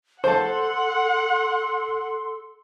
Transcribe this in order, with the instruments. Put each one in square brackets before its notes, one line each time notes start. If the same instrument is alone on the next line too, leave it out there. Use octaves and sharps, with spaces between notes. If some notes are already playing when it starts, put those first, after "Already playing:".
[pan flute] A4 [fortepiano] C5 A5 [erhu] F#5 [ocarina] C6